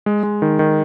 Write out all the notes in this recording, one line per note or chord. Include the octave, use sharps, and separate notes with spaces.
G#3
G#3
D#3
D#3